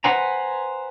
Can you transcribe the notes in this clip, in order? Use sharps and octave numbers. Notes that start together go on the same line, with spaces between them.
B4 C5 F#5 G#5 A#5